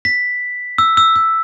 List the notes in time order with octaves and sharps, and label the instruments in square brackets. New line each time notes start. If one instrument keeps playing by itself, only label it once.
[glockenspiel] B6
E6
E6
E6